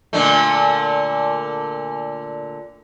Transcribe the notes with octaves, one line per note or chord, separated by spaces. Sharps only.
A#2 D3 A3